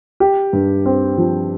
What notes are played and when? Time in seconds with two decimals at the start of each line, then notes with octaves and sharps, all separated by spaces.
0.20 G4
0.53 G2
0.86 C4
1.18 F3